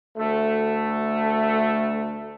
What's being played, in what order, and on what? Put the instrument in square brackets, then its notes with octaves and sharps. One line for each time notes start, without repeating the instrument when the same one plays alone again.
[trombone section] D2 A3